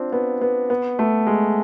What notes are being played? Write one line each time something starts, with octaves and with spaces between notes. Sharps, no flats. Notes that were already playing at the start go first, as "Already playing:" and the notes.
Already playing: C4 D4 F4
B3
B3
B3
A3
G#3